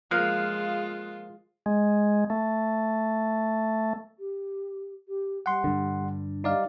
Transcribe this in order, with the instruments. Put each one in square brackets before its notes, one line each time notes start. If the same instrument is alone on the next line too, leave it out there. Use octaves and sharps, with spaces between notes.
[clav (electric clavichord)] F3 A#3 [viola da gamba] G#3 F4 [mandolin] F5 [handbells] F#6
[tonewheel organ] G#3
A3
[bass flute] G4
G4
[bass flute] G3 [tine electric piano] F#5 C6
[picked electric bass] G2 D3
[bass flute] G3 [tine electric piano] D#4 D5 F5